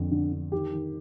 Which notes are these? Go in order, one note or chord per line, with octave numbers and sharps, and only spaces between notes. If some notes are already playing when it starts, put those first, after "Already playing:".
Already playing: F2 D3
D3
D3
D#3 G4
D#3